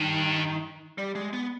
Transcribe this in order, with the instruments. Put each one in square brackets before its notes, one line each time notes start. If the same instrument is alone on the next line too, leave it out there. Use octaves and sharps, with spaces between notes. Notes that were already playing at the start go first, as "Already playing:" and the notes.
Already playing: [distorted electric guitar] G2 [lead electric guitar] D#3
[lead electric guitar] G3
G#3
B3